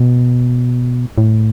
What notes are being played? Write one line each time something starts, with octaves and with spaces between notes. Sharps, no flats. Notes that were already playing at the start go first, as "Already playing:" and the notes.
Already playing: B2
A2